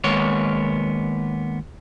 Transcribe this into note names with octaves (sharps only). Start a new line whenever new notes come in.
D#3 G#3 A#3 B3 C#5